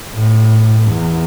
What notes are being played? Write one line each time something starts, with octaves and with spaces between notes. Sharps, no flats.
A2
E2